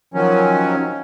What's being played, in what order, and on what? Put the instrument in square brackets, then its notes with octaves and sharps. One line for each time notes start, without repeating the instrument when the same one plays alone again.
[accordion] D#3 F3 F#3 C#4